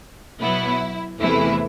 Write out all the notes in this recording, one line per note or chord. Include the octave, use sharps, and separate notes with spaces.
B2 F#3 B3 E4
E2 C3 E3 A3 E4